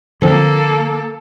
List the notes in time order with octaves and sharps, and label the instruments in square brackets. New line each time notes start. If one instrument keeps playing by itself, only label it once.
[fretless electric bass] D3 F3 C4 [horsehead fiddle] A#3 A4